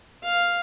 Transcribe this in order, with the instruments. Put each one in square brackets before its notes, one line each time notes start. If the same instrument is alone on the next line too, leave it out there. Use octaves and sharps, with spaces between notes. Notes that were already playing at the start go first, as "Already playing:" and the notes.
[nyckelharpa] F5